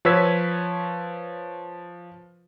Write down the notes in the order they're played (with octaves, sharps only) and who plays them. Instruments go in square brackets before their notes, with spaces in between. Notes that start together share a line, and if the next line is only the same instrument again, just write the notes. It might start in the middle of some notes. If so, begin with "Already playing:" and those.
[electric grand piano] F3 B4 C#5 E6 G#6 B6